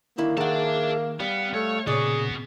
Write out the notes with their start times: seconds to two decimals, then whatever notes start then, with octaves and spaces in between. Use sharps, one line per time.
0.18 D3 D#3 A#3 E4
0.37 D#3 G#4 D5 E5 F#5 A5
1.20 G3 B3 F5
1.54 A3 C#5
1.87 A#2 C#3 B3 F#4 G#4 C#5 D5